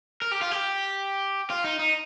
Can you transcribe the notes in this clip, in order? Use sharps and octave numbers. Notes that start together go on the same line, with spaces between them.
A#4
G4
F4
G4
F4
D#4
D#4